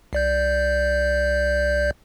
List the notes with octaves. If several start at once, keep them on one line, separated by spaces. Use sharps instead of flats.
C2 D5 G6